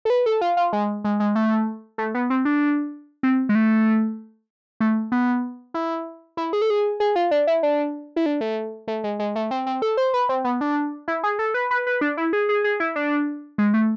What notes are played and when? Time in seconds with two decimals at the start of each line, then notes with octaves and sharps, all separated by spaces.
0.05 A4
0.10 B4
0.26 A4
0.41 F4
0.57 F4
0.73 G#3
1.04 G#3
1.20 G#3
1.35 A3
1.98 A3
2.14 B3
2.30 C4
2.45 D4
3.23 C4
3.49 G#3
3.55 A3
4.80 A3
5.12 B3
5.74 E4
6.37 E4
6.53 G#4
6.62 A4
6.70 G#4
7.00 G#4
7.16 F4
7.31 D4
7.47 E4
7.63 D4
8.16 E4
8.26 D4
8.41 A3
8.88 A3
9.04 G#3
9.19 G#3
9.36 A3
9.51 C4
9.66 C4
9.82 A4
9.97 C5
10.14 B4
10.29 C4
10.44 B3
10.61 D4
11.08 E4
11.24 G#4
11.39 A4
11.54 B4
11.71 B4
11.87 B4
12.01 D4
12.17 E4
12.33 G#4
12.49 G#4
12.64 G#4
12.80 E4
12.96 D4
13.58 G#3
13.74 A3